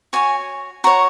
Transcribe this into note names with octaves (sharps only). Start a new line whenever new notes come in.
F#4 C#5 G#5
F#4 C#5 A#5